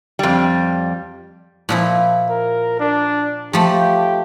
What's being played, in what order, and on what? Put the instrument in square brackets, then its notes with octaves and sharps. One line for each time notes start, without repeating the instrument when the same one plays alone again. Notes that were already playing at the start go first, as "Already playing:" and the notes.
[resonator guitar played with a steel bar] F2 G3
[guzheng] A#2 F3 E4
[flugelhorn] A#4
D4
[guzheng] F3 A3 B5 [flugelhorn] G4